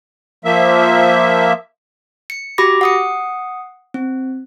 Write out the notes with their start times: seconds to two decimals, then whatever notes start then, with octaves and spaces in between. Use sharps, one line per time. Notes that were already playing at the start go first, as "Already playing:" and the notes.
0.45 F3 A#3 E5
2.30 C#7
2.58 F#4 G4 B5 D6 A#6
2.81 F#5 D#6 C#7
3.94 C4